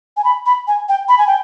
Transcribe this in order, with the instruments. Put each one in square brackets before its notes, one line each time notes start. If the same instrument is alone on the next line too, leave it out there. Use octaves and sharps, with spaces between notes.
[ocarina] G#5
B5
B5
G#5
G5
B5
G#5
G5